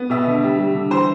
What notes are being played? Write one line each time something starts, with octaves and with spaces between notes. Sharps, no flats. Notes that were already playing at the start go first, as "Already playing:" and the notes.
Already playing: B3
B2 E5
D3
G3
G3
D3
E3 C5